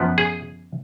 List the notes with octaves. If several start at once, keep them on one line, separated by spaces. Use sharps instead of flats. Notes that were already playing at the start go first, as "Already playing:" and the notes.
Already playing: F#2 F3 B3
G#4